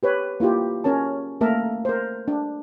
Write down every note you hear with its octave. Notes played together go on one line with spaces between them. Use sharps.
G4 B4 C#5
A#3 E4 F4 G4
C#4 A#4 C#5 A5
A3 A#3 A#4 E5 A5
A#4 C5
D4